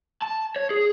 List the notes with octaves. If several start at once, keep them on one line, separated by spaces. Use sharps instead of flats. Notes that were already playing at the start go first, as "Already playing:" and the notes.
A5
C#5
G#4